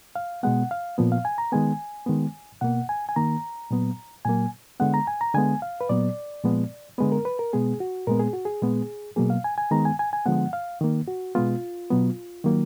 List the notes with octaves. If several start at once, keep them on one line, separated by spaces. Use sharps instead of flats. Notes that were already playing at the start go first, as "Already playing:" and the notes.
F5
B2 G#3 B3 F#5
F5
A#2 F3 B3
F5
G#5
A#5
D#3 G#3 B3 G#5
D#3 G#3 B3
B2 A#3 F#5
G#5
G#5
D#3 A#3 A#5
A#2 F#3 B3
A#2 F#3 A#3 G#5
D3 G#3 B3 F#5
A#5
G#5
A#5
D3 G#3 B3 G#5
F5
B4
A#2 F#3 B3 D5
A#2 F3 G#3 B3
D3 G#3 B3 B4
A#4
B4
A#4
B2 G#3 B3 G#4
F#4
A#2 G#3 B3 A#4
G#4
F#4
G#4
A#2 G#3 B3
B2 F#3 A#3 G#4
F5
G#5
G#5
D#3 G#3 B3 A#5
G#5
G#5
G#5
D3 F3 G#3 B3 F#5
F5
D#3 A#3
F#4
B2 G#3 B3 F4
B2 F#3 B3
D#3 F#3 A#3